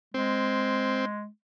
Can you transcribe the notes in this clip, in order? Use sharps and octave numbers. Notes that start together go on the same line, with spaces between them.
G#3 C4